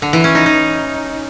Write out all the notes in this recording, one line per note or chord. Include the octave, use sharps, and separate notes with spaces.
D3
E3
C#4
D#4
D#4